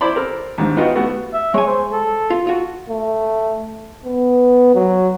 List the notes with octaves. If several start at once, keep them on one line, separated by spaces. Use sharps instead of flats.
E4 C5 D5 B5 C6
C4 A4 A#4
D#2 G#2 D4
B3 D#4 F4 F#4 F#5 G5
A3 B3 F#4 G4
E5
G#3 C#5 G#5
C5
A4
F4
F4 F#4
A3
B3
F#3